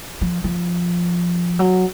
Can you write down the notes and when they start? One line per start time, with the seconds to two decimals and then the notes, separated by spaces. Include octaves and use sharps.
0.21 F3
0.44 F3
1.59 F#3